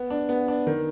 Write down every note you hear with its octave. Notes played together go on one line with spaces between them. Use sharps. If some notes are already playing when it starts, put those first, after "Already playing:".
Already playing: B3
D4
B3
D4
D#3